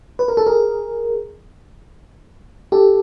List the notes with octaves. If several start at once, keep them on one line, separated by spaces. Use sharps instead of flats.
B4
A#4
A4
G#4 A#4
G4 A4